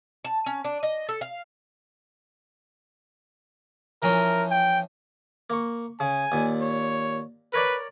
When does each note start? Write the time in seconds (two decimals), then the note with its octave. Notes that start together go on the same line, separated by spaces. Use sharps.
0.25 A5
0.46 C#4
0.65 D4
0.83 D#5
1.09 A4
1.21 F5
4.03 E3 F3 C#4 A#4
4.51 G5
5.50 A#3 C#6
6.00 C#3 G#5
6.32 D#2 A#2
6.62 C#5
7.54 A#4 B4 C#5 D5